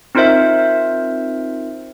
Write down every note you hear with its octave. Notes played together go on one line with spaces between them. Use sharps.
C4 D#4 F4 A#4 C5 E5